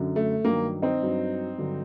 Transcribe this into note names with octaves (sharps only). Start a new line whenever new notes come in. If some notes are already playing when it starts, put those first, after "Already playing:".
Already playing: F#2 D3 F#3
A3
G2 D#3 F#3 A#3
C4 D#4
G2 F#3
G2 D3 F#3